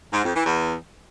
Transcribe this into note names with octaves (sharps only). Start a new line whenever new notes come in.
G#2
F2
E3
E2